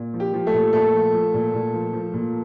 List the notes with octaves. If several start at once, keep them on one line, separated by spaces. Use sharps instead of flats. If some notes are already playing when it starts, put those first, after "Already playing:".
Already playing: A#2
F3
G4
F3
A3 A4
A#2
A#2 A3 A4
F3
F3
A#2
A#2
F3
F3
A#2